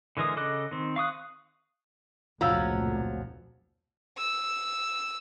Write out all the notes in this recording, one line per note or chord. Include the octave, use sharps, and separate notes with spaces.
D3 E3 G#3 A#4 D#6
C#3 A4 D#5 D6 F#6
D#3 C4
F5 C#6 D#6 F#6
F1 C#2 A#2 F3 F#3 F4 F5 E6
E6